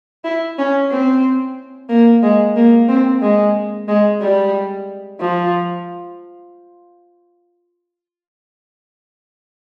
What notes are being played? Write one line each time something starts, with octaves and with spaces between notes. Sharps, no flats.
E4
C#4
C4
A#3
G#3
A#3
C4
G#3
G#3
G3
F3